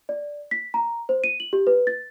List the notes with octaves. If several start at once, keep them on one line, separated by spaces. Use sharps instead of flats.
D5
B6
A#5
C5
D#7
F#7
G4
B4
A6